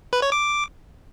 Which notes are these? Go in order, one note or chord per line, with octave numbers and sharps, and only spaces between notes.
B4
C#5
D6